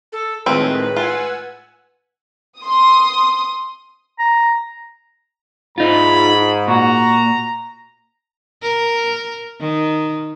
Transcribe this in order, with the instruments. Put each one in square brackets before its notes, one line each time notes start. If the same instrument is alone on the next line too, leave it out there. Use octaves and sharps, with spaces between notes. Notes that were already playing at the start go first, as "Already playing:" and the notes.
[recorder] A4
[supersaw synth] A2 D#3 G#3 [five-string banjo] F3 C4 [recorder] B4
[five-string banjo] F4 [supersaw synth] F#5 G#5 E6
[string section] C6 D#6
[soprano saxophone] A#5
[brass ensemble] G#2 [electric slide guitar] D#4 F4 [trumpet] B5
[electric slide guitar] A#2 [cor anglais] F#4 [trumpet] A#5
[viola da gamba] A#4
D#3